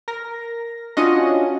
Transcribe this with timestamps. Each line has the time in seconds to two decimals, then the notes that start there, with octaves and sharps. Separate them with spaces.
0.08 A#4 A#6
0.97 C#4 D4 F4 F#4 D#5